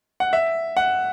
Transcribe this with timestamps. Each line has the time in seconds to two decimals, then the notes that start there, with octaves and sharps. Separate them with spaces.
0.20 F#5
0.33 E5
0.77 F#5